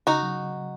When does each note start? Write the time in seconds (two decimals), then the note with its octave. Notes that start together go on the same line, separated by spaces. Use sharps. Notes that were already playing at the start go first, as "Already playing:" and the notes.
0.07 C#3 D#4 F#4
0.23 F#3